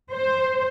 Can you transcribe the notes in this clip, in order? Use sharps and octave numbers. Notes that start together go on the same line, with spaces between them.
C5